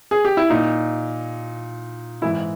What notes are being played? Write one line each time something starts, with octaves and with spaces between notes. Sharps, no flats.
G#4
G4
E4
A#2 D#4
G#2 E3 E4